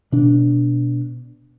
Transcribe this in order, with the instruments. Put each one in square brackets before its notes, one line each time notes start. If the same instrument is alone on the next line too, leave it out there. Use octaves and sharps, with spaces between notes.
[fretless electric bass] B2 D4